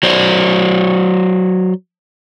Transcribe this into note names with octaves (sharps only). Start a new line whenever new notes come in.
F#3 C5 D5